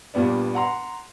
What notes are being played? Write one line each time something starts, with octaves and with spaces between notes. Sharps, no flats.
G2 A#2 G3 B3 D4
F#5 A#5 C6